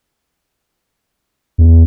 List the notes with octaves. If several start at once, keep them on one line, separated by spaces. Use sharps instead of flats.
E2